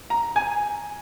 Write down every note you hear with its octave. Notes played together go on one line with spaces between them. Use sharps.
A#5
G#5